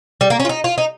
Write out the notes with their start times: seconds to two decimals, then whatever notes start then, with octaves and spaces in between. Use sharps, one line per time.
0.21 G3
0.30 A#3
0.40 C#4
0.45 F4
0.49 D#4
0.64 F4
0.78 D#4